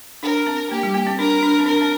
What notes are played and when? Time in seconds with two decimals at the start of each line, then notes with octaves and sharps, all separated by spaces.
0.23 D4 A#4
0.47 C4
0.71 A#3 G4
0.83 G3
0.94 A#3
1.07 C4
1.18 D4 A#4
1.43 D4
1.59 C4
1.66 D4 A#4
1.81 C4